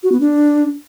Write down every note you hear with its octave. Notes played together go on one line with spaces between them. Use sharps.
F#4
B3
D4